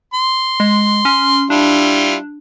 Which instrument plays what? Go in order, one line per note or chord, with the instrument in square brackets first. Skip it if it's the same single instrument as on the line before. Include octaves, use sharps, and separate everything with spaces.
[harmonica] C6
[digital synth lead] G#3
C#4
[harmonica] G3 E4 F4 [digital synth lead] D4